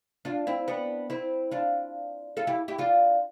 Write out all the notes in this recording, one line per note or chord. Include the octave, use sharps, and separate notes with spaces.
D4 F4
C4 E4
B3 D4
C4 E4
D4 F4
F4 A4
E4 G4
E4 G4
D4 F4